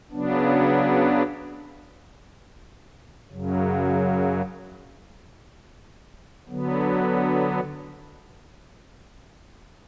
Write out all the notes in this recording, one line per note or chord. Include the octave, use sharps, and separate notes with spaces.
C#3 F#3 B3 D4
F#2 C#3 F#3
D3 F#3 B3